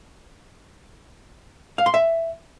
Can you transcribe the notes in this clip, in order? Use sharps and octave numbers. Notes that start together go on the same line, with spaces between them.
F5
C6
E5